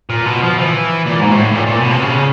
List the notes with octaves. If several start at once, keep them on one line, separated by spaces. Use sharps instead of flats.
A#2
B2
F3
E3
A#2
G#2
A2
A#2
A#2
B2
C3
C#3